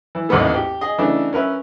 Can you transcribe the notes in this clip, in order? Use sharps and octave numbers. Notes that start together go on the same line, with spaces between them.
E3
A1 D#2 G#2 A#3 B3 A4
G4
G#4 D#5
C#3 E3 A3 D4 D#4
C#4 A#4 B4 E5